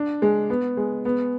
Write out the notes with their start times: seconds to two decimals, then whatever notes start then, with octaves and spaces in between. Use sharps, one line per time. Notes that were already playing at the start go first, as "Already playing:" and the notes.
Already playing: D4
0.22 G#3
0.50 B3
0.77 G#3
1.05 B3